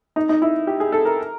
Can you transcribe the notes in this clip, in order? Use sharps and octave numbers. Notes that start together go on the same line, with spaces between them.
D#4
D#4
E4
G4
G#4
A4
A#4